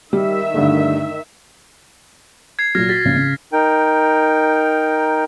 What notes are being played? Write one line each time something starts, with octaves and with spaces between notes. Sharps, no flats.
D#3 G3 E5
G2 D3 A3
G#6 C7
A#2 F#3 F6 G#6 A#6
F#4 A6 B6
A#1 C#3
C#3
D#4 A#4 G5